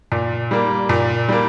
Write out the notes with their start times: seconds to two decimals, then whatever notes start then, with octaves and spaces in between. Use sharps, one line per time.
0.12 A#2
0.51 G3 A#3
0.89 A#2
1.29 G3 A#3